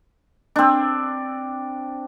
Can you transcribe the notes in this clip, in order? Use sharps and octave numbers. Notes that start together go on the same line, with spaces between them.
C4 D4